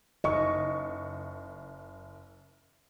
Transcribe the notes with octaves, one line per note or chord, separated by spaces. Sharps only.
F#1 D#5 C#6